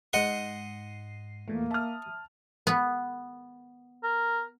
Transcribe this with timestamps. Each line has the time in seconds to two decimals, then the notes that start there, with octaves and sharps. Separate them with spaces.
0.13 G#2 D#5 F#5 C6 C7
1.48 E2 A#2 E3 A3 A#3
1.71 E5 A5 D#6 F6
2.67 B3
4.04 A#4